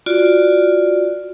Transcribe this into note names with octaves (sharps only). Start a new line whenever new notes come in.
F4 F#4 D5